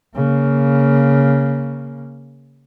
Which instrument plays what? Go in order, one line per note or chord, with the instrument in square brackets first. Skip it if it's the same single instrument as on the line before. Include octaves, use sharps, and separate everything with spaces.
[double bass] C#3 A#3